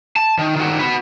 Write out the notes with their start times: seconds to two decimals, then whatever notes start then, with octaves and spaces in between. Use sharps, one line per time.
0.16 A5
0.39 D#3
0.56 D#3 F#4
0.79 F#4 B4